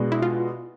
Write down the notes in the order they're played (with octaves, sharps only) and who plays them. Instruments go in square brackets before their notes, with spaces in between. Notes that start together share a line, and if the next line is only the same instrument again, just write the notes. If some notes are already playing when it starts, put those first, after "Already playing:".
Already playing: [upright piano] B2 G#3 B3 D4 F#4
[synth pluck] E4
F4